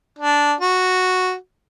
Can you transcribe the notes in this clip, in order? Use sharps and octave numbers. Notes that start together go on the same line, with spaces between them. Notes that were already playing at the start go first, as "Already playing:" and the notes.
D4
F#4